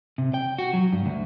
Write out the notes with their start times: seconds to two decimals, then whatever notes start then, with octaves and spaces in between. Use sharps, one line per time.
0.18 C3
0.34 G5
0.59 F#4
0.73 F#3
0.92 G2
1.06 D2